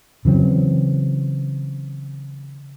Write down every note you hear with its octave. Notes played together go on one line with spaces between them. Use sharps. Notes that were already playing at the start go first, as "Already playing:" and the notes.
C#3 E3 F#3 C4